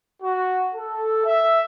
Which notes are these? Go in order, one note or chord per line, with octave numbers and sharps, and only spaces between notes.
F#4
A4
E5